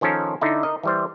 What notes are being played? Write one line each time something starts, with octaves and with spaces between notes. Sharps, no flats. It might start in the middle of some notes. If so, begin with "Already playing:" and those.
D#3 F3 C#4 A4 A#4
D3 D#4 E4
A#4 D#5
E3 G3 C5